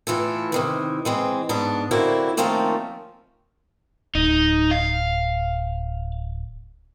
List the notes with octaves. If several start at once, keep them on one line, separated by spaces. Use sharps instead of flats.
A2 E3 F4 A4
C3 D#3 E3
E3 G#3 C4
G#2 B3 D4 A5
D3 F#3 A3 A#3 C4 E4
D#3 F3 A3 A#3 C4 C#4
D1 D#4
F5